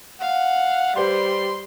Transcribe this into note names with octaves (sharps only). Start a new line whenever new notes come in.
F5 F#5
G3 G4 B4 C5 C6